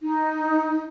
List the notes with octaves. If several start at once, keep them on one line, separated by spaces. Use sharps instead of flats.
D#4